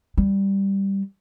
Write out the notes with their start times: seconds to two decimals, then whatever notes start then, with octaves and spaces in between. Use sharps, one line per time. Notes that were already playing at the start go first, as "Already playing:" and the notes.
0.18 G3